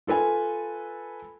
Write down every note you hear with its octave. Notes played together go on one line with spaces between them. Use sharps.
F4 A4 B4 G#5